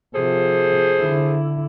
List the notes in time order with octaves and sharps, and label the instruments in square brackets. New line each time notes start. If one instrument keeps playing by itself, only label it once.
[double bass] C3 F3 [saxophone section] G#4 A4 C5
[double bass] D3 E4